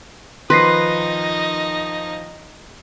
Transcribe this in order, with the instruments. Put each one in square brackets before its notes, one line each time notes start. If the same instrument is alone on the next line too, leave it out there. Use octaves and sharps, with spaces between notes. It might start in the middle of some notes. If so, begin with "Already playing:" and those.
[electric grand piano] D#3 F3 [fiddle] D#4 D#5 [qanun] B4 [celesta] C6 A#6 C7